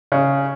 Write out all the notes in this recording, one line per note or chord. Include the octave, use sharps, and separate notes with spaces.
C#3